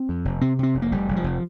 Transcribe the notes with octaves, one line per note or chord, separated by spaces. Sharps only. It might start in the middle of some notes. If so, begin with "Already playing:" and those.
Already playing: C4
F2
F1
C3 C4
C3 C4
F1
A#3
F1 G3
F1
F3
F1